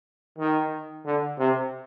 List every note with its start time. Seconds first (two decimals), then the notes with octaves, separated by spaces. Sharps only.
0.38 D#3
1.05 D3
1.39 C3